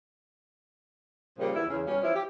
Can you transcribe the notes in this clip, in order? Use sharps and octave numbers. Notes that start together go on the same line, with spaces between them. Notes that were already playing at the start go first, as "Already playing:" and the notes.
A#2 C#3 F3 G3 A#3
E2 E4
E2 C#3
B2 G3 C#4
E3 F3 C#4 E4
G4